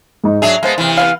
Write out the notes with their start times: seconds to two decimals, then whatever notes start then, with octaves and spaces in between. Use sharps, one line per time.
0.24 G#2 D#4
0.42 F#3 D4 G#4 E5 F7
0.63 G#3 A#3 B3 C5 A5
0.78 C3 E3
0.97 B3 C#4 F5